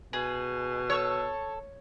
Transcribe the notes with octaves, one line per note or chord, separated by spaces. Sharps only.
B2 G#4 B4
A4 C#5 E6